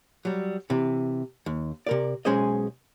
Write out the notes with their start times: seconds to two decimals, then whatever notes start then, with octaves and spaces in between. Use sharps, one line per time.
0.25 F#3 G3
0.70 C3 E3
1.46 D#2
1.87 C3 A#4 D5
2.25 B1 G#3 C#4 G#4 C5 D#5